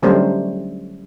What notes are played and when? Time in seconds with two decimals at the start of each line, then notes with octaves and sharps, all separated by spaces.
0.03 D3 F#3 G3 A3 C#4 C5